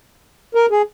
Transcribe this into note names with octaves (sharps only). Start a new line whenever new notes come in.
A#4
G#4